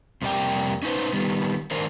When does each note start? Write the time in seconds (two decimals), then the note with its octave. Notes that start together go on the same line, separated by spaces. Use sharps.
0.22 F2 C3 G3 A#3 D5 G5
0.83 C#4 D#4 B4 C5
1.13 D#3 G3 B3
1.71 D#3 D4 A#4 C5